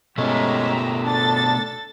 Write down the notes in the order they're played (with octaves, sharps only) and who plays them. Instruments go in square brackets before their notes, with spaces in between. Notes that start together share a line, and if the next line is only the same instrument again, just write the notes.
[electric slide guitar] B2 A3 [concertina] G#3 C#4 C#5 [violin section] G4 E5 A#5
[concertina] D4 [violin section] A4 A6